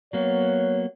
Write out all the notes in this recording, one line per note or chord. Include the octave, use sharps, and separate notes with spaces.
F#3 A#3 B3 C#5